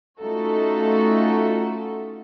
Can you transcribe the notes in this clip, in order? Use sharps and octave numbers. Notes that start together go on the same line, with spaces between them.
A3 C#4 D#4 F4 F#4 A4